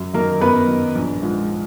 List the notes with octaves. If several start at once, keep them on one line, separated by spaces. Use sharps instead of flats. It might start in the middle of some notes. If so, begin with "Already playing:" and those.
Already playing: F#2
D#3 F#3 A#3 A#4
F#2 B3 B4
D#3 F#3
A#1
G#2 F3